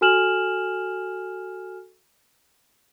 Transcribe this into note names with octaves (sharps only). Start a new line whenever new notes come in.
F#4 A4 G#5 F6 E7 F#7